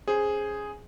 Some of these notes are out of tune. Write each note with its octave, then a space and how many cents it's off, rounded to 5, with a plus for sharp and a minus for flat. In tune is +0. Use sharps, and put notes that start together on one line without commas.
C#4 +0 G#4 +0 C5 +5